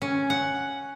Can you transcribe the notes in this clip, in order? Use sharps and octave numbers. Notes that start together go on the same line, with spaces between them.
C#4
F#5